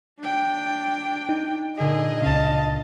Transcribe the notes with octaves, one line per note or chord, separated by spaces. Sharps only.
D4 G5
D#4
A#2 D3 G#4 D#5 D7
C#2 C#3 F5 A5